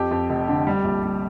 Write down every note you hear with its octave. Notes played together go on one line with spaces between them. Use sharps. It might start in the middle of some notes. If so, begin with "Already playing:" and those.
Already playing: F2 G4
F2
F1
D3
G3
A#1
G3